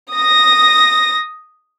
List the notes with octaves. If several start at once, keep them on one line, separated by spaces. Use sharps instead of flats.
D#6 A#6